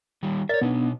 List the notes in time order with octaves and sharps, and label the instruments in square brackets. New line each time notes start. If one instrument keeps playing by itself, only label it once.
[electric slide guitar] D#3 G3
[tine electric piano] A#4 D5 A6 [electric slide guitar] C#5 E5
[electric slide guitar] B2 D#4 [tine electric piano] B3 D4